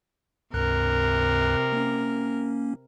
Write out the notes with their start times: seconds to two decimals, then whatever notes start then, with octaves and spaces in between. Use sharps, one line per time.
0.54 C#2 G2 C3 A#4 F#6
1.73 A#3 C#4